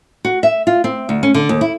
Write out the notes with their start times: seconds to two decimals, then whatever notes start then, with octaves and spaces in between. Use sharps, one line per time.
0.25 F#4
0.43 E5
0.67 F4
0.84 C4
1.09 D2
1.23 C#4
1.34 D3
1.49 D#2
1.61 E4